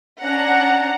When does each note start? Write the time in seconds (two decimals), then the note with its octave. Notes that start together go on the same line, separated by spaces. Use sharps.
0.21 C#4 D4 F#5 A#5